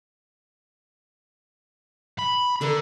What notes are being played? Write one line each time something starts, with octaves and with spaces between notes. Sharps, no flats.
B5
D3 A4 A#4